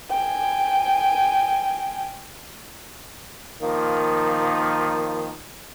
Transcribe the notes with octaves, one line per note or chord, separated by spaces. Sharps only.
G5 G#5
D#3 F3 A#3